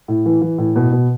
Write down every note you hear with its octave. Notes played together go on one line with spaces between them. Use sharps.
A2
E3
E3
A2
B2
B2